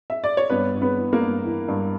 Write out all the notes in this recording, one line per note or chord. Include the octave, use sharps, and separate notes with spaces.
E5
D5
C#5
G2 B3 B4
G2
B3 B4
E3
A#3 A#4
G2
E3
G2